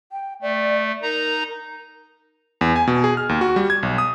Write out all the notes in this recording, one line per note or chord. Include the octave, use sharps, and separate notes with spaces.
G5
A3 D5
D#4 A#4 A#5
E2
G#5
B2
G#4
F6
D#2
F#4
G3
G#6
B1
D#6